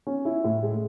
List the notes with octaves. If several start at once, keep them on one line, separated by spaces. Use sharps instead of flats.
C#4
E4
A2
G#3